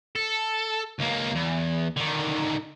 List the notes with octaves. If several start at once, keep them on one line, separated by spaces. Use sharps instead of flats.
A4
C#2 A#3
E2
D3 D#3